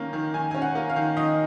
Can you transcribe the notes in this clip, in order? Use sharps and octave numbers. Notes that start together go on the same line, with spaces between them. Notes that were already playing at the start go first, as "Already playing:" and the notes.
Already playing: D#3 A#3 C#4
D#3
D#3 G#5
C#4 G#5
F#5
A#3
F5
D#3
D#3 D#5